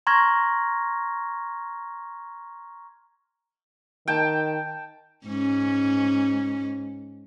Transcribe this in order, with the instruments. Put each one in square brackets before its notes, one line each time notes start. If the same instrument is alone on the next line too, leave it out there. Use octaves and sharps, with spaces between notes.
[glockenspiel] A#5 C6 C#6 F6 G#6 A#6
[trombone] D#3 [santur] G5 A5
[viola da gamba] G#2 C#4